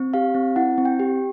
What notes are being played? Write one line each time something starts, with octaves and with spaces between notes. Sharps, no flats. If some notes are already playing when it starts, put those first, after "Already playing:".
Already playing: C4
G4 F5
C4
E4 F#5
C4
G5
G4